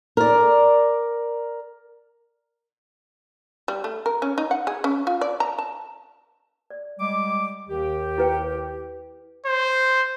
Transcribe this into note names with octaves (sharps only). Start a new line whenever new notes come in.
A#4 D5
G3
A3
A#4
C#4
D#4
F#5
G#4
C#4
F4
D5
A#5
A5
D5
G3 G#3 D6
D#2 D#3 G4
E4 B4 G5
C5